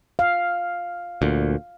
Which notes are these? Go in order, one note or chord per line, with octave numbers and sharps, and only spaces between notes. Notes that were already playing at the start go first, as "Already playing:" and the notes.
F5
D2 A#2